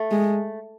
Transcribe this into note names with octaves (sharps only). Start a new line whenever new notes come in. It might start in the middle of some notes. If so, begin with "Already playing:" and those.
Already playing: A3
G#3